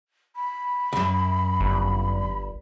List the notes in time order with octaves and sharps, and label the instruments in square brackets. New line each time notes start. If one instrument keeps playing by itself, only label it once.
[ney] B5
[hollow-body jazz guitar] C#2 F#2
[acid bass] G1